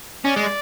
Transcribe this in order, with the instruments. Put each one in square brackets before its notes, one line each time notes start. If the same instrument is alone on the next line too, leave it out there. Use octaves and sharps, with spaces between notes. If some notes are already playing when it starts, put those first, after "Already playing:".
[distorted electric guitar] C#4 [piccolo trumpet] D5
[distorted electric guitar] G#3